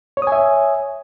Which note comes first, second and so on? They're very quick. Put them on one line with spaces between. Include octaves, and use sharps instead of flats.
C#5 D#6 G#5 E5